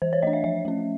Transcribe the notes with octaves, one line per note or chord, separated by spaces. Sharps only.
E3 C5
C#5
A3 D4 D#5
E5
F3 E5
A3 C#4